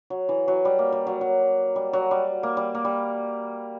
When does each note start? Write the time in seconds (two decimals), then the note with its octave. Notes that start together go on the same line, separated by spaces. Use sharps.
0.10 F#3
0.29 E3
0.48 F#3
0.65 G3
0.79 A#3
0.92 G3
1.07 F#3
1.21 F#3
1.76 G3
1.93 F#3
2.11 G3
2.43 A#3
2.57 G3
2.75 A#3
2.85 G3